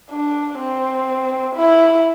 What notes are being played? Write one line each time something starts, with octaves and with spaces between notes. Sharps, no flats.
D4
C4
E4